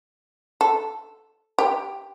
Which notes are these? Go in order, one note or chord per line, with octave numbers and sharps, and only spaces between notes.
A4
G4